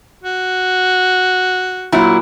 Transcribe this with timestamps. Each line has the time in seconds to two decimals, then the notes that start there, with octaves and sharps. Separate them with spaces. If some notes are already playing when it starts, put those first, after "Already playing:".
0.24 F#4
1.92 A#2 F#3 E4